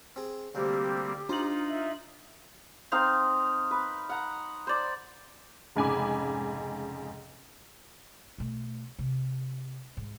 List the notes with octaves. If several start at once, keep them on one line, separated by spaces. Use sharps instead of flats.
C4 G#4
D2 C3 G3 A#3 C4 G4
D4 D#4 F4 C5 F#7
E5
C4 D#4 F5 C6
B4
F#5 A#5
C5 D5
F1 G#2 C#3 G#5 B5 D6
B2 A3
C3
G#2